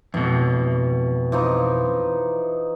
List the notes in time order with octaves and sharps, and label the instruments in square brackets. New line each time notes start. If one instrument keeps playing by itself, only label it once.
[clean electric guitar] F2 B2 [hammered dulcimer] E3
[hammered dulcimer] E3 F3 D#4